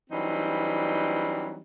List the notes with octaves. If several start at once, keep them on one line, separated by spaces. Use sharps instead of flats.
E3 F#3 G3 C4 D4 D#4